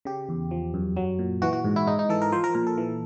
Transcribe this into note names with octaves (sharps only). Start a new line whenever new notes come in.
C#3 G4
E2
F3
F#2
F#3
A#2
E3 F#4
F#4
G#2
E4
G#2 D#4
D#4
E3 A4
A#4
F3 C5
A#4
A#2 A#4
A4
E3